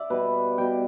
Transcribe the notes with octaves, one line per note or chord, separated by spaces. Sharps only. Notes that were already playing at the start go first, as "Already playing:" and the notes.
Already playing: D5 E5
B2 G3 B4
B2 G3 G5